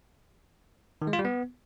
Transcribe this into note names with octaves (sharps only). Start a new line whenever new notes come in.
D#3
G#3
F4
G3
B3